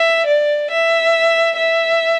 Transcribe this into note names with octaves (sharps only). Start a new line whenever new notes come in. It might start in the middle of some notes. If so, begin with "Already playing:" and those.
Already playing: E5
D5
E5
E5